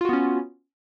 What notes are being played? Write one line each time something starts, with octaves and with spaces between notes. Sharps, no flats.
B3 C#4 F4 F#4